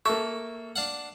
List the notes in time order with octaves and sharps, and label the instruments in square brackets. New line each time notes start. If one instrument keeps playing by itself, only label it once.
[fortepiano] A#3 A4 [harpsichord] E5 [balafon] C#6
[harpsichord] D4 F5 F#5